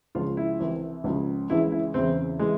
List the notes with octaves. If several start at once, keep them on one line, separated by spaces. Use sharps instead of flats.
C#2 C#3 F3 F4
E4
C2 C3 E3
C#2 C#3 F3
C#2 C#3 E3 E4
E4
E2 C#3 E3 C4
C3 E3 G#3